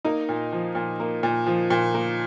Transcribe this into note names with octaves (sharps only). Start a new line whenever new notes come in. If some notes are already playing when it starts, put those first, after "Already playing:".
A#3 D#4
A#2
F3
A#2
A#3
A#2
F3
A#2
A#3